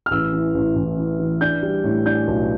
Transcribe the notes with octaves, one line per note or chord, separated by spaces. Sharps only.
F6
A1 E6
E3
A1
A1
E3
E3
D4 G6
G3
A2
D4 G6
B1